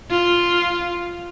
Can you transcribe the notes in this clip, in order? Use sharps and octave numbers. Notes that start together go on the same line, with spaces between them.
F4